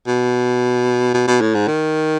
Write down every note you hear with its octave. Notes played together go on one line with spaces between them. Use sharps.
B2
B2
B2
A2
G#2
D#3